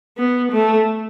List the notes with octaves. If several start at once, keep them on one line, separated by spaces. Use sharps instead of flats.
B3
A3